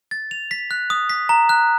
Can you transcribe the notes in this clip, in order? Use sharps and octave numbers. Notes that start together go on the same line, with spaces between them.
A6
F7
B6
F#6
D#6
B6
A#5
F#6